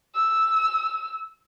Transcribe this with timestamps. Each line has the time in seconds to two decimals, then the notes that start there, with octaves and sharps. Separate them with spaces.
0.15 E6